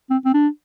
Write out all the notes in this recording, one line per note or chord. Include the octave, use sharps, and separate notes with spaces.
C4
C4
D4